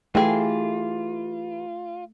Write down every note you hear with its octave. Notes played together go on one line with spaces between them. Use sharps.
E3 A3 F4 G4 G#4